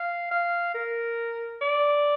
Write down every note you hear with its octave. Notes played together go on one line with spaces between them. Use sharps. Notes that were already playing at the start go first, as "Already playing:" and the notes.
Already playing: F5
F5
A#4
D5